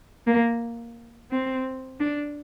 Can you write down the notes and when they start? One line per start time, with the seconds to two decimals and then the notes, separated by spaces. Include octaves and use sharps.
0.27 A#3
1.31 C4
2.00 D4